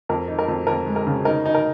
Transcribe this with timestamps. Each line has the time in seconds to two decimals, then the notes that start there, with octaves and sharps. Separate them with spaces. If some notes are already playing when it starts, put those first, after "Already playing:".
0.09 F2 A#4
0.28 D#4
0.39 A#4
0.48 F2
0.67 F2 A#4
0.86 G#3
0.96 A#4
1.07 C#3
1.25 D#4 A#4
1.45 D#4
1.55 A#4